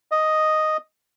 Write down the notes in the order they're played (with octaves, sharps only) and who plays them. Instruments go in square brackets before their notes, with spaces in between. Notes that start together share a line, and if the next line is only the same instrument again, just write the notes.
[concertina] D#5